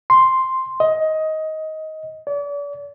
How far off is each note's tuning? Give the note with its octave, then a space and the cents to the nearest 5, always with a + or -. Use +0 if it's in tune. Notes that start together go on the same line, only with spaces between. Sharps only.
C6 +0
D#5 +15
D5 -40